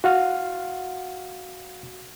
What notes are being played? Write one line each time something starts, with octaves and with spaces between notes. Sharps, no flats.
F#4 F5 F#5 F6